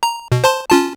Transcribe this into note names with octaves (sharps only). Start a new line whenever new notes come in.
A#5
B2
C5 A5 C6
C#4 F4 A5